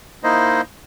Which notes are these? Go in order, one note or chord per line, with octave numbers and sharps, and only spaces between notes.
A#3 D#4 E4 C5 D#5